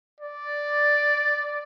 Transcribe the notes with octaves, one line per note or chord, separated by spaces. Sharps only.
D5